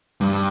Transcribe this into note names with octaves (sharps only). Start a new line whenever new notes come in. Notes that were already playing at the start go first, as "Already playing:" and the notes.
G2